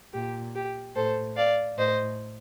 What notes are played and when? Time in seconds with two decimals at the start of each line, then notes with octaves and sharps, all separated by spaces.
0.13 A#2 G4
0.55 G4
0.95 A2 A4 C5
1.36 D5 F5
1.78 A2 C5 D#5